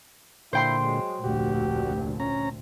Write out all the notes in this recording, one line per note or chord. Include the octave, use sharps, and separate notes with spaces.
A#2 D3 E4 C5 G5 C6
F#3 G#3
F1 D2 A#2 F#4 G4
C#4 A#5